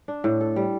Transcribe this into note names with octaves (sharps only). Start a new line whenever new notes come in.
D4
A2
A4
G3